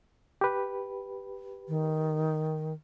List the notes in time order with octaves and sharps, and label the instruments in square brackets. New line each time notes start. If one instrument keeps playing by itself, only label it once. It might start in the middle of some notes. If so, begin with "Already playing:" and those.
[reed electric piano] G4 B4
[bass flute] D#3